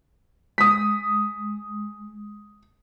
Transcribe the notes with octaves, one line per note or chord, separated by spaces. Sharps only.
G#3 D#6 B6